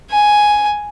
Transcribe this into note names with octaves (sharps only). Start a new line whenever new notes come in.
G#5